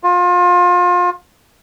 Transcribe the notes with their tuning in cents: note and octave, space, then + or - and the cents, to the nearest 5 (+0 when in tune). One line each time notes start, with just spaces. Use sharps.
F4 +30